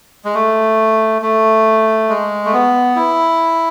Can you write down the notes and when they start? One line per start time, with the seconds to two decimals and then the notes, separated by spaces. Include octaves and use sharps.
0.25 G#3
0.35 A3
1.22 A3
2.09 G#3
2.45 A3
2.53 B3
2.95 E4